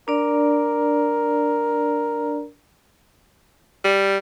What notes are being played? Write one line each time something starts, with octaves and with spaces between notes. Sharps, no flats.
D4 A#4 D5
G3